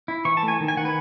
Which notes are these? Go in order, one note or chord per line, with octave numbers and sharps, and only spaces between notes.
E4
E3 C#6
A5
A3
G#5
D#3
G#5
D#3 F#5
B4